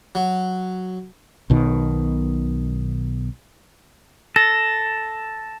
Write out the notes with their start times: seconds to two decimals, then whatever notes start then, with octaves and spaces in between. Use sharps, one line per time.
0.15 F#3
1.50 B1 B2 D#3
4.36 A4 A#6